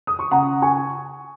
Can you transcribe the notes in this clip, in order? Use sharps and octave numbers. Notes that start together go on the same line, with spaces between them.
D#6
C#6
C#3 F#5 A#5
G#5 C#6